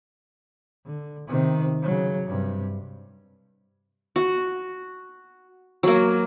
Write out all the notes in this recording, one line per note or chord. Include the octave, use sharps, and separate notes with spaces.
D3
C3 D#3
C#3 F#3
G2 C3
F#4
F#3 A#3